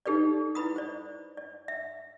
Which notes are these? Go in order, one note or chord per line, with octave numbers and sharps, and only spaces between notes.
D#4 G4 A4 B4 D5
E4 B4 B5 D#6
C5 D5
D5
E5